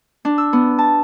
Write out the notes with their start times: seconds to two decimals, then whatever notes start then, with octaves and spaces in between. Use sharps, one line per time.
0.25 D4
0.38 E6
0.53 B3
0.79 A5